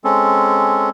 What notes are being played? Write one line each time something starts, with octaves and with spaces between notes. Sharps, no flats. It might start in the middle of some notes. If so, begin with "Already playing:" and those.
G#3 C4 C#4 A4